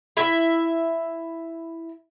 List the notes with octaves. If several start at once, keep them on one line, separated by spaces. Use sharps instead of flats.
E4 E5